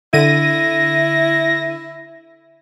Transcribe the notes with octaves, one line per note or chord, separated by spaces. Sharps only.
D3 E4 A#6 D#7